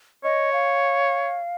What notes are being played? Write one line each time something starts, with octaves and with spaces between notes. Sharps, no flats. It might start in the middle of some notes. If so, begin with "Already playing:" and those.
C#5 D#5
F5